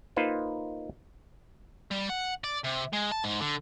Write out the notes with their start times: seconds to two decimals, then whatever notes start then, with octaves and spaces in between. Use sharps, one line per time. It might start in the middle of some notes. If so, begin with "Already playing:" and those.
0.16 A#3 D#4 F4 B4 C5
1.91 G3
2.09 F#5
2.44 D5
2.64 C3
2.93 G#3
3.12 A5
3.24 G#2
3.40 D3